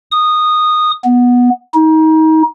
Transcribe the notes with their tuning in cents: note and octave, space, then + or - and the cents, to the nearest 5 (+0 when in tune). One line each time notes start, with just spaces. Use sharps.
D#6 -15
B3 -10
D#4 +30